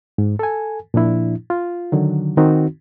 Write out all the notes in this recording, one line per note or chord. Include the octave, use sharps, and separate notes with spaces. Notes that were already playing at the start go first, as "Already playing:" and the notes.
G#2
A4 G#5
A#2 F3 D4 E4
F4
D3 D#3 F#3
D#3 C4 D#4 F#4